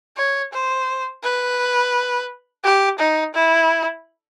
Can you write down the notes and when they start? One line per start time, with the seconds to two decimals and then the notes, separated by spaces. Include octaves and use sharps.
0.17 C#5
0.52 C5
1.23 B4
2.64 G4
2.99 D#4
3.34 E4